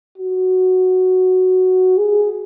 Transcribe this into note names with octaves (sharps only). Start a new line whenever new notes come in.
F#4
G#4